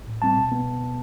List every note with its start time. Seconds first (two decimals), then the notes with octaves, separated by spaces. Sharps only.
0.07 A2
0.22 G3 C4 A5
0.36 B2
0.52 B3